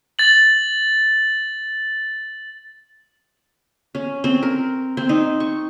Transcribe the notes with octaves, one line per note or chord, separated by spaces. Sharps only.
A6 F#7
C#4
C4
A#4
C4
D#4
C#6